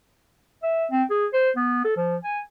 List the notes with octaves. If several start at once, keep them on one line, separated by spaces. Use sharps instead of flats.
E5
C4
G#4
C5
B3
A4
F3
G#5